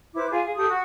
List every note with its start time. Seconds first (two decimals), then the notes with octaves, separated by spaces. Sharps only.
0.14 E4 B4 C5 D6
0.31 F4 G#4 F5 G#5
0.44 G#4
0.56 G4 A4 A5 D#6
0.70 F#4 F#5